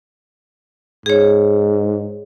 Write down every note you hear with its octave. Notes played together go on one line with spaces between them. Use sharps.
G#2 G#4 C#5